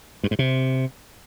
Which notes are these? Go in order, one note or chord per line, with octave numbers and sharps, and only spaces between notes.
G2
G#2
C3